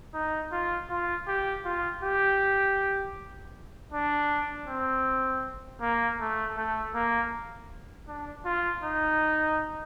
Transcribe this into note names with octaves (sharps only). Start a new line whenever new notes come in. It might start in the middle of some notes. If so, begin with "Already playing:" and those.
D#4
F4
F4
G4
F4
G4
D4
C4
A#3
A3
A3
A#3
D4
F4
D#4